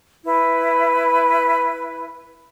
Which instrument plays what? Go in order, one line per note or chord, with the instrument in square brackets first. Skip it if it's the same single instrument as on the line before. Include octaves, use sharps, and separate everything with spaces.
[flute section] E4 B4